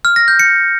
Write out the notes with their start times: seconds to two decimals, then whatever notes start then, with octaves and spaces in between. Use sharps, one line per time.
0.05 F6
0.16 A#6
0.28 G6
0.39 C#7